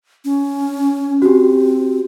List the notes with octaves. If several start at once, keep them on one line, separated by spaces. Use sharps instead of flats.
C#4
C4 F#4 G4